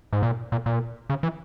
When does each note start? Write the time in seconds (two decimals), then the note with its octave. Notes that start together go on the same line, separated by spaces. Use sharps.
0.13 G#2
0.23 A#2
0.52 A#2
0.66 A#2
1.10 C#3
1.23 E3